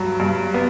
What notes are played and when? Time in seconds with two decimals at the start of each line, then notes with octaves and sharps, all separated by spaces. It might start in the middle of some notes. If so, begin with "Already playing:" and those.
Already playing: G2 F#3
0.20 G2
0.54 B3